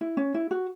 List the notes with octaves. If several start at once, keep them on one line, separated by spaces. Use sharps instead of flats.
E4
C#4
E4
F#4